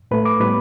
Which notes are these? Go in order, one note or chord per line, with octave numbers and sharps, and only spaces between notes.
A2 A3 B4
D6
A2 G3 B3 B4